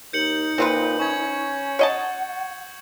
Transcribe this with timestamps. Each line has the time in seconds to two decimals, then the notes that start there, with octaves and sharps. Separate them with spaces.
0.13 D#2 D#4 G6 C#7 F#7
0.58 A#2 C4 F4 B4
0.99 C#4 C#6 G#6
1.79 C#5 D#5 F#5 A5